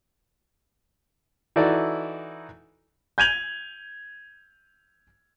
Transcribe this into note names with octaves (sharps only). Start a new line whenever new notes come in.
E3 D#4 E4 F#4 A4 D5
G6 G#6 D#7 F7 F#7